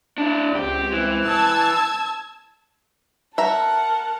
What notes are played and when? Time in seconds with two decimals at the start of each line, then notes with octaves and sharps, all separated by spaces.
0.18 D4 E4
0.55 C#2 C4 G4
0.93 E3
1.25 A5 E6 G#6
3.38 A#4 E5 F#5 A5 A#5